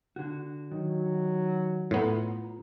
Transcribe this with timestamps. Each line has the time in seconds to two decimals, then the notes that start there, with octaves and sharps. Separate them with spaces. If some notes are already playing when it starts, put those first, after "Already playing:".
0.16 D3 F#4
0.71 D#3 F#3
1.91 A2 B3 F4 A#5